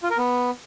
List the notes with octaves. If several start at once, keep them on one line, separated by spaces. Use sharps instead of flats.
F4
A#4
B3